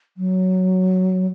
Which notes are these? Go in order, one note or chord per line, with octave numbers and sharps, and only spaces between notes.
F#3